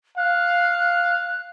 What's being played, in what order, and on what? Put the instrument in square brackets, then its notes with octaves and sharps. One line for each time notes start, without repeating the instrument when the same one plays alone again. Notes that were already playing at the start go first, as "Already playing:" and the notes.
[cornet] F5 [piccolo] F#6